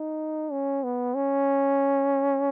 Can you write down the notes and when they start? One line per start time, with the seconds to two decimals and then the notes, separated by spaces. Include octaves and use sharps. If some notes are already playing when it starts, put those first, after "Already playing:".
Already playing: D#4
0.52 C#4
0.84 B3
1.15 C#4